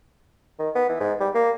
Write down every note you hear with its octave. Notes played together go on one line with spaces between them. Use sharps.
D#3
B3
E3
G#2
G3
A#3